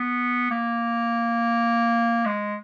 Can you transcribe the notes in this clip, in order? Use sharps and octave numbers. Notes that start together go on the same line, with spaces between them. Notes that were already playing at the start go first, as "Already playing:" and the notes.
Already playing: B3
A#3
G#3